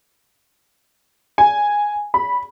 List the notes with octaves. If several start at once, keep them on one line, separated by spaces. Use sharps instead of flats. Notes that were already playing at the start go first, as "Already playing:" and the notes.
G#5
B5